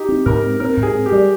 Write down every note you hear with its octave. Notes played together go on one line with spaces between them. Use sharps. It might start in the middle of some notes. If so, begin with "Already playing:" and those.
Already playing: D#4 G4
C4
G#2 A#4
C4
C4 A#4
G#2
G#4
C4
G4
G3